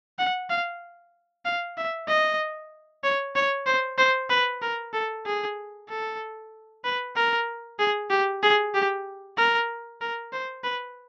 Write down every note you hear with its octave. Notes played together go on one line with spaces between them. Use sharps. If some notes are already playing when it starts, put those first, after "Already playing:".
F#5
F5
F5
E5
D#5
C#5
C#5
C5
C5
B4
A#4
A4
G#4
A4
B4
A#4
G#4
G4
G#4
G4
A#4
A#4
C5
B4